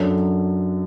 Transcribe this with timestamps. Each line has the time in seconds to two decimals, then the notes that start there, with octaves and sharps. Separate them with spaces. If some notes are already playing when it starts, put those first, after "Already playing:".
Already playing: F#2 F#3 D4 A4